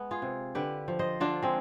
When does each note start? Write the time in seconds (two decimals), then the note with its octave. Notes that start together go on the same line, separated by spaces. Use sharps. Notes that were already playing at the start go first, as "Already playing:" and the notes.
Already playing: G#3 B3
0.11 F4 G#4
0.22 C3
0.55 D3 G4 B4
0.88 F3
0.99 C5 D#5
1.20 D3 D4 F4
1.43 G#3 C4